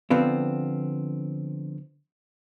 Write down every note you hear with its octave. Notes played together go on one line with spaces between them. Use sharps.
D3 F3 B3 C4